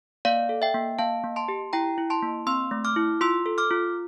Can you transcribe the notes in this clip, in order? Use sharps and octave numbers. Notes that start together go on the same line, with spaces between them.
A#3 D5 F5
A4
E5 G5
A#3
A#3 F5 A5
A#3
A5 C6
G4
E4 G5 A#5
E4
A5 C6
A#3
C4 C6 E6
A3
D6 F6
E4
F4 C6 E6
A4
D6 F6
F4